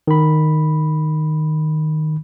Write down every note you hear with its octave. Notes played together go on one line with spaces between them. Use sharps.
D#3 B5